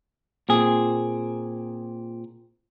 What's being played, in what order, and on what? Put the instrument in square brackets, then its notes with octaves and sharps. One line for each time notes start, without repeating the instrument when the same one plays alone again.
[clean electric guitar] A#2 C4 G#4